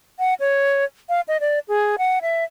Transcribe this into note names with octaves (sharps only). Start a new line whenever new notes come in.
F#5
C#5
F5
D#5
D5
G#4
F#5
E5